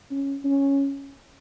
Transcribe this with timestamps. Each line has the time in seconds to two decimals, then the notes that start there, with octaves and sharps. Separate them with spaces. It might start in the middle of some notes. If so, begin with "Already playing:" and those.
0.11 C#4
0.44 C#4